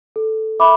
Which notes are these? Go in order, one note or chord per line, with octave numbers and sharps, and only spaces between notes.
A4
E5 B5 D6